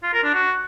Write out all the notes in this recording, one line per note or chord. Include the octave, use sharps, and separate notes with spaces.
F4
A#4
D4
F#4